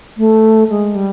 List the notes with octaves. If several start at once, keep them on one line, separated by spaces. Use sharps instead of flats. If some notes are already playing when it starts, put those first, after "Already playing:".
A3
G#3
G3